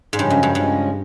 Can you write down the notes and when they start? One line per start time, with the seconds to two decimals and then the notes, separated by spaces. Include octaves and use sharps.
0.13 G#2
0.18 G2 C#3 F3 G#3 C#4
0.30 F#2
0.43 G2
0.54 G2 C#3 F3 G#3 C#4